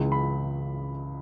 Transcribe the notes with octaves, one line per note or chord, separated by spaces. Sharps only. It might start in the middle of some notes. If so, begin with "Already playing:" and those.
Already playing: C#2 C#3 E3 G#3
B5